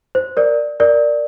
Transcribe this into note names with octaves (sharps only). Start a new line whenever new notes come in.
C5
A#4 D5
A#4 D5